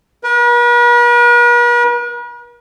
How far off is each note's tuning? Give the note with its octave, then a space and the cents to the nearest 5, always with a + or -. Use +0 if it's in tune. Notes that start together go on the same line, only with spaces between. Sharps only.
B4 -45